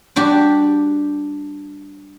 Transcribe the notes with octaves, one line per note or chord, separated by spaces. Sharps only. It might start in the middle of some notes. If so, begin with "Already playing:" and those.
G3 D4 F#4 G4